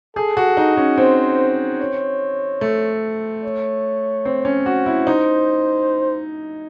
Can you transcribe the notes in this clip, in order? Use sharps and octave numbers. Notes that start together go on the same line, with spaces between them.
G#4 A4
F#4
D#4
C#4
C4 C5
C#5
A3
C#5
C4
C#4
F#4
E4
D#4 C5